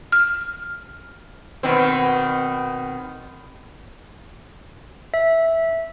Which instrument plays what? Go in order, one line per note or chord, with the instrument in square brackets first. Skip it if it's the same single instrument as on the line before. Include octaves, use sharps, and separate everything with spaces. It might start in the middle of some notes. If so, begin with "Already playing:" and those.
[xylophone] F6
[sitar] B2 D#3 C4
[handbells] E5